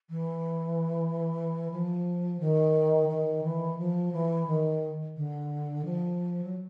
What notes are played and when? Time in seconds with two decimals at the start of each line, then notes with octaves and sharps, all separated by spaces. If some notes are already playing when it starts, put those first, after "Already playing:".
0.10 E3
1.71 F3
2.40 D#3
3.09 D#3
3.44 E3
3.78 F3
4.12 E3
4.47 D#3
5.17 D3
5.85 F3
6.44 F#3